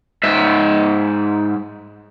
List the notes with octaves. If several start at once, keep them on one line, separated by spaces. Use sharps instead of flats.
G#2 E5